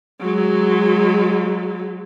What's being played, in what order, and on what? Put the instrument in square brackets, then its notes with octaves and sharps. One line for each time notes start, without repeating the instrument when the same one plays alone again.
[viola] F#3 G#3